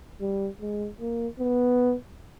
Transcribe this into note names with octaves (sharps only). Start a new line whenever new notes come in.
G3
G#3
A#3
B3